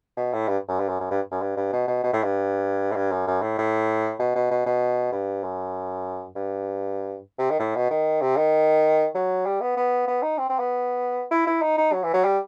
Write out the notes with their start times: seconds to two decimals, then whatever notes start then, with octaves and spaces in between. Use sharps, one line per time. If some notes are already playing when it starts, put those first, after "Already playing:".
0.17 B2
0.33 A2
0.48 G2
0.68 F#2
0.79 G2
0.89 F#2
1.00 F#2
1.11 G2
1.31 F#2
1.41 G2
1.56 G2
1.73 B2
1.88 B2
2.04 B2
2.13 A2
2.24 G2
2.92 A2
2.96 G2
3.12 F#2
3.27 F#2
3.42 A2
3.58 A2
4.19 B2
4.36 B2
4.51 B2
4.66 B2
5.12 G2
5.44 F#2
6.36 G2
7.39 C3
7.50 D#3
7.59 A2
7.75 B2
7.90 D#3
8.22 C3
8.37 D#3
9.15 F#3
9.46 G3
9.61 B3
9.77 B3
10.08 B3
10.22 D#4
10.38 C4
10.49 C4
10.59 B3
11.31 E4
11.47 E4
11.62 D#4
11.78 D#4
11.93 F#3
12.03 E3
12.13 F#3
12.24 G3